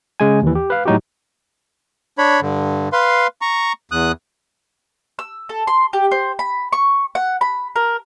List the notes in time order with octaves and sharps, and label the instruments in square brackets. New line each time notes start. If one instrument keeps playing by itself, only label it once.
[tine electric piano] C#3 G#3 G#5
D#2 E3
G4
B4 F5
A2 F#3 D#4 F#4 G4
[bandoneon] D4 C#5 B5
G2 D3
B4 F5 C6
A#5 C#6
E2 D#6 F#6
[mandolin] E6
A4
C6
G4
C5
B5
C#6
F#5
B5
A#4